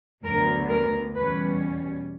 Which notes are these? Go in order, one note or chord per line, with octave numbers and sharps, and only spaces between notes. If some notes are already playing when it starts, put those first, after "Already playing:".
D2 D3 F#3 B3 A#4
A#4
E2 B2 G3 C#4 B4